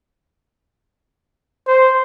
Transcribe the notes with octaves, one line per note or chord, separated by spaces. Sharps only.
C5